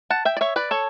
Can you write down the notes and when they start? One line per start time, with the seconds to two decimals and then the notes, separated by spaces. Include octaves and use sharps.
0.10 F#5 A5
0.25 E5 G5
0.37 D5
0.41 C#5 E5
0.56 B4 D5
0.71 A4 C#5